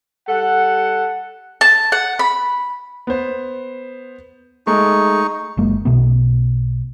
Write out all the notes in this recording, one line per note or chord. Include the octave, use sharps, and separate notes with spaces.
G3 A4 F#5
A5
F#5
B5
B3 C5
G#3 A3 D#4 C#6
F#1 F#2 G#3 A#3
B1 B2 A3 B3